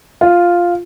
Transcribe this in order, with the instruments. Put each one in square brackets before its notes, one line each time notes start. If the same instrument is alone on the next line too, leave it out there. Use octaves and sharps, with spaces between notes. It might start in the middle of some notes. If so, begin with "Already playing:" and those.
[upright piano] F4